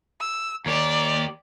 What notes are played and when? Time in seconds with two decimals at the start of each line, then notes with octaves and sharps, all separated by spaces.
0.21 E6
0.66 D#2 G4 D5